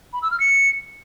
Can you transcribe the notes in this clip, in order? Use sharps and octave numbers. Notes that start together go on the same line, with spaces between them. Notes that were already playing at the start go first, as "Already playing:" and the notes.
B5
E6
F6
C#7